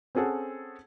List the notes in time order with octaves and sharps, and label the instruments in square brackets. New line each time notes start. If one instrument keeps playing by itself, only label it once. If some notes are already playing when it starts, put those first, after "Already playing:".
[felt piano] C4 C#4 G#4 A4 F#5